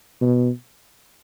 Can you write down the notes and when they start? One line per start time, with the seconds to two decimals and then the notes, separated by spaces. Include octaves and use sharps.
0.21 B2